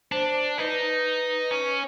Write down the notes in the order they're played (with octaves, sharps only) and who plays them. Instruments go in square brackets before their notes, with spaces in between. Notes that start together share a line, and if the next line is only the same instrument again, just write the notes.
[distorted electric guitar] D4 [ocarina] C5
[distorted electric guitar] D#4 [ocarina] B4
[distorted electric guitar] C#4